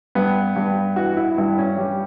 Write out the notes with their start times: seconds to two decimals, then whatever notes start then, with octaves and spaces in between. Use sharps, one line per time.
0.15 G2 B3
0.56 G2
0.96 E3 F#4
1.17 E4
1.38 G2 E4
1.58 C#4
1.78 G3